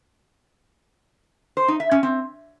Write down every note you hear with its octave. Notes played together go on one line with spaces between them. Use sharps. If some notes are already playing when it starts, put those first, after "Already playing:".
C5
D#4
E5
C#4
C4